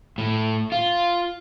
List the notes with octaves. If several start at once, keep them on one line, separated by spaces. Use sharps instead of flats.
A2
F4